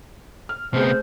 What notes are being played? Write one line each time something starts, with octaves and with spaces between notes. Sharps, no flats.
F6
C3 A3 B3 G#4 C5